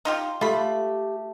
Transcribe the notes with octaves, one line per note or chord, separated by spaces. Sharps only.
D#4 F4 G4 C6
A3 F4 G4 B5